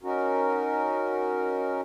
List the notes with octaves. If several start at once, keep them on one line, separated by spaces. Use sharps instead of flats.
C#4 D#4 F#4 A#4